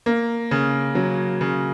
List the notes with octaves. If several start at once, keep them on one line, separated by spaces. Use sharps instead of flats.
A#3
C#3
F#3
C#3